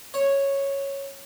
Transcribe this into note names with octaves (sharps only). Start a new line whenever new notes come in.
C#5